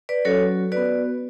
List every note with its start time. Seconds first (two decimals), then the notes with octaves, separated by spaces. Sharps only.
0.09 B4 D5
0.25 F#3 C#4 F#4 A4 C#5
0.72 B3 F#4 B4 D5